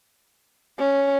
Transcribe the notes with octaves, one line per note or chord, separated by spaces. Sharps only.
C#4